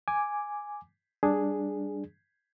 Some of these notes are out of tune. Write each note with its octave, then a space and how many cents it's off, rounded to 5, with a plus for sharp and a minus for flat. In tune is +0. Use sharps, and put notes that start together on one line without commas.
G#5 +0 D6 +0
G3 +0 D4 +0 G#4 +0